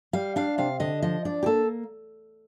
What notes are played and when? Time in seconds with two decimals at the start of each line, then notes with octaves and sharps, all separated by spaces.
0.13 G3 F5
0.36 D4 F5
0.58 C3 F5
0.80 D3 D#5
1.02 F3 D#5
1.25 D4 D5
1.43 G4
1.46 A#3 A4